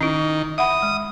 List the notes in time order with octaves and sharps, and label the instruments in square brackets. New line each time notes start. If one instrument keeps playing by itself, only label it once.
[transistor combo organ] D#3 [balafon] C#4 E4
[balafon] E5 F#5 B5 [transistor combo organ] D#6
[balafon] G#3